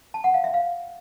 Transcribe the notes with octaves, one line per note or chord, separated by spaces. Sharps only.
A5
F#5
F5
E5
F5